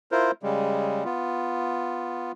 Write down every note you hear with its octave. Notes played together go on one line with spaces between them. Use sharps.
E4 F4 A#4 C5
C#3 G3 G#3
B3 F4